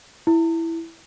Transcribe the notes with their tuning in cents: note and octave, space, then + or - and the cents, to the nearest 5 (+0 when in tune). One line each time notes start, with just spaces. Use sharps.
E4 +0